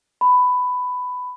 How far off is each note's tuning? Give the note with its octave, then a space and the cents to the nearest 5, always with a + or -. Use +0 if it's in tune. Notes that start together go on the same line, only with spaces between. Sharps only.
B5 +15